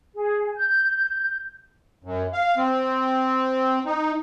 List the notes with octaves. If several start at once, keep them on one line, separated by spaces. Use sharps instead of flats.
G#4
G6
F#2
F5
C4
D#4